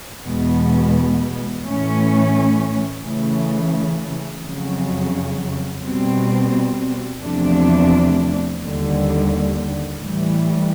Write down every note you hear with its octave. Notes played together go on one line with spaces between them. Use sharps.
E2 B2 G#3 B3
A2 E3 A3 C#4
C#3 E3 A3
F2 C#3 F#3
B2 G3 C4
E2 C3 F3 A3 D4
D#2 D3 G3
A2 E3 G3